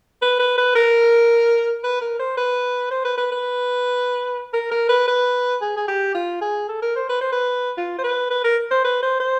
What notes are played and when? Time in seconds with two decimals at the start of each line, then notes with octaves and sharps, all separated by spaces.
0.22 B4
0.39 B4
0.57 B4
0.75 A#4
1.84 B4
2.01 A#4
2.19 C5
2.37 B4
2.91 C5
3.05 B4
3.17 B4
3.32 B4
4.53 A#4
4.71 A#4
4.89 B4
5.07 B4
5.61 G#4
5.77 G#4
5.88 G4
6.14 F4
6.41 G#4
6.69 A4
6.82 A#4
6.96 C5
7.09 B4
7.21 C5
7.32 B4
7.77 F4
7.98 C5
8.04 B4
8.30 B4
8.44 A#4
8.71 C5
8.84 B4
9.02 C5
9.20 C5